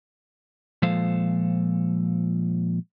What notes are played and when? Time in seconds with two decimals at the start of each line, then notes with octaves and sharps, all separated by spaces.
0.82 A#2 F3 G#3 A4 C5 F5